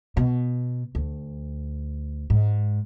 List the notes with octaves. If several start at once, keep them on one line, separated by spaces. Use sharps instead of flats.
B2
D2
G#2